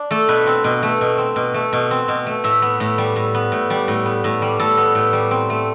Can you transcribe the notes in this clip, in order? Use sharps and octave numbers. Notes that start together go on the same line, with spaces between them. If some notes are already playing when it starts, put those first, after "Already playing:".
Already playing: D4
A3 A4
B2 B4
C4
B2
A3
B2
C4
B2
A3
B2
C4
B2
A3
A2 E5
B3
A2
G3
A2
B3
A2
G3
A2
B3
A2
G3
A2 A4
B3
A2
G3
C4
A3